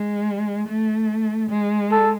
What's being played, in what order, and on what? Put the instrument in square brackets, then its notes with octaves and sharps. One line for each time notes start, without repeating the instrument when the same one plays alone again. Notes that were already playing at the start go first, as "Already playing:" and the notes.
Already playing: [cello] G#3
A3
G#3
[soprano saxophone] A4